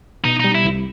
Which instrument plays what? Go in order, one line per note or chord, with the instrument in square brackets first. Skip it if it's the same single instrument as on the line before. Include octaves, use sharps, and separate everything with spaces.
[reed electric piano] B2 [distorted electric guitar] D#4
[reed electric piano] G3 [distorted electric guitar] D#4
[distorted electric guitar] E4
[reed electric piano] C2